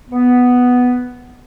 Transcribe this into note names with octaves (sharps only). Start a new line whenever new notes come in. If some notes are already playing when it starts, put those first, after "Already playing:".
B3